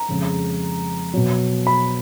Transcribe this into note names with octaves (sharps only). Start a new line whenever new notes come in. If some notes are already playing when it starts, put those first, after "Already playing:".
Already playing: A#5
F2 C#3 G#3
B2 F#3
B5